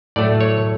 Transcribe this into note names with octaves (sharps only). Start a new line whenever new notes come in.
A2 F#3 A3 D5
C#5